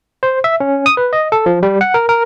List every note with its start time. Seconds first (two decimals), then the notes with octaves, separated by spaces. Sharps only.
0.23 C5
0.44 E5
0.60 C#4
0.86 D#6
0.97 B4
1.13 D#5
1.32 A4
1.46 F3
1.63 G3
1.81 F#5
1.94 A#4
2.09 A#4